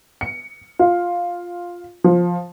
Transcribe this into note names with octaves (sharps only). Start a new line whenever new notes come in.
C#7
F4
F3